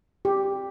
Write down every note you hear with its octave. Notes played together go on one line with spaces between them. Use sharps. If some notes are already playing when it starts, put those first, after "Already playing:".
G4